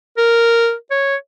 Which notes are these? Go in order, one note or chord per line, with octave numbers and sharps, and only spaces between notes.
A#4
C#5